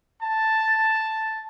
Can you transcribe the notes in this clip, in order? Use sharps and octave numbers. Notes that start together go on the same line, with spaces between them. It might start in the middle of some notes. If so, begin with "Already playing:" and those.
A5